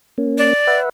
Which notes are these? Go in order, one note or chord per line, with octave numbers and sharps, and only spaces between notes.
A#3 C#4
D5
B4 E5 F#5